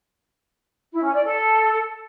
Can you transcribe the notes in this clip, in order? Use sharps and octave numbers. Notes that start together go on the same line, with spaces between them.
E4
C#4
D5
A4